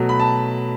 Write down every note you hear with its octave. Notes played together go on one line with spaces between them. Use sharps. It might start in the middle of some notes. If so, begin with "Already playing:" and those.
Already playing: B2 F#3 A3
B5
A5